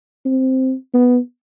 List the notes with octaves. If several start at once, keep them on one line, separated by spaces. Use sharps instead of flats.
C4
B3